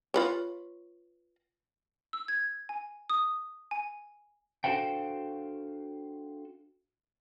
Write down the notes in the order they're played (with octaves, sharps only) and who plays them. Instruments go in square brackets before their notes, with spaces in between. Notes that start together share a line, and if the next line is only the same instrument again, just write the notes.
[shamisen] F4 B4 C#5
[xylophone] E6
G#6
G#5
D#6
G#5
[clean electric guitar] D4 F#4 A4 C5 F5 G5